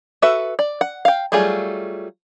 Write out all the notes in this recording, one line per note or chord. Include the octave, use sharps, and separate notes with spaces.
F#4 A4 B4 E5
D5
F#5
F5 G5
F#3 G3 A3 F4 G#4